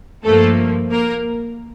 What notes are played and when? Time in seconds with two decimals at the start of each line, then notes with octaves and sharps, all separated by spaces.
0.24 G2 F3 A3 A#3 A4
0.91 A#3 A#4